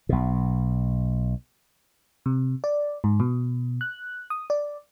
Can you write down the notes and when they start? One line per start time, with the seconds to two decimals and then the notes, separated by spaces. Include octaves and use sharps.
0.09 B1 B2
2.26 C3
2.64 D5
3.04 G#2
3.20 B2
3.81 F#6
4.30 D#6
4.50 D5